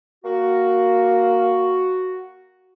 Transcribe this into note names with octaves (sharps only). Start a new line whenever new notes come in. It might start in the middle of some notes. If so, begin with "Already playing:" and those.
A#3 F#4